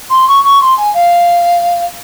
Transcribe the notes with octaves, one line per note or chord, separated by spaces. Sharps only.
C6
C#6
C#6
C6
G#5
F5